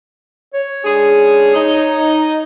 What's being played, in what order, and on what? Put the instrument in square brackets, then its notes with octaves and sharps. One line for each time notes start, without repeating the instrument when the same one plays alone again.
[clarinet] C#5
[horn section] G#3 D4 G#4
D#4